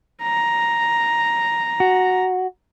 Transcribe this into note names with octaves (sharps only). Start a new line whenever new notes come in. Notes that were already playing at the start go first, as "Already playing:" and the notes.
A#5
F#4